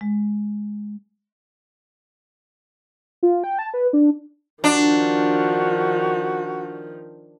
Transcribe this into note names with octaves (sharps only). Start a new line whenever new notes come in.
G#3
F4
G5
A5
B4
D4
D#3 F3 D4 F#4